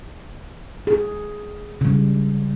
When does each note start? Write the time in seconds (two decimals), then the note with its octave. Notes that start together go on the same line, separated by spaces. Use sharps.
0.87 G#4
1.81 C#3 G3